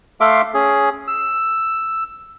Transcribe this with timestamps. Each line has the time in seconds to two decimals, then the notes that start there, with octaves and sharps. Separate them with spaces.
0.21 A3 A4 E5 F5 C6 D6
0.54 C#4 G#4
1.08 E6